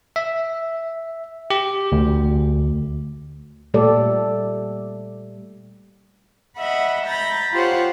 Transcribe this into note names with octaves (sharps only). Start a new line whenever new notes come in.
E5
G4
D2
A#2 G3 A3 G4 A4 D5
D#5 E5 F#5 B5
A#5 B5 G6 A6 A#6
F4 G4 C5 C#5 F#5